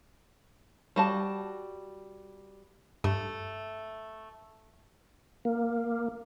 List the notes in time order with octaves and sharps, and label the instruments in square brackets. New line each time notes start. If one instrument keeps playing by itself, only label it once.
[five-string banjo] G3 F#4 A5
[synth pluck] G2 [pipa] A3
[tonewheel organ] A#3